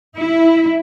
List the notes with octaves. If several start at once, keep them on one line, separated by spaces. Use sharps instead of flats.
E4